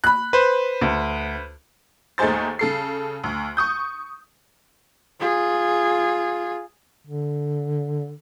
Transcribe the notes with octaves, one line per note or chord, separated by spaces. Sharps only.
B5 F#6
B4 C5
D2
D#2 A3 D#4 G#4 C5 A6
C#3 A4 C7
D2
C#6 D#6 G6
F4 G#4
D3